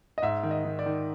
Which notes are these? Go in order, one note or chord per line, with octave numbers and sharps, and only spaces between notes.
D#5
G#2 E5
D#3
D#5
D#3
D5
D#3